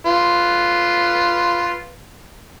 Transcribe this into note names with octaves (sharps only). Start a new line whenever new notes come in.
F4 B4